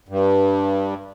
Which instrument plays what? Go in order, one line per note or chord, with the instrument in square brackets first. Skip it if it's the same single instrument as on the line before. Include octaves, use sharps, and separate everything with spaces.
[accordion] G2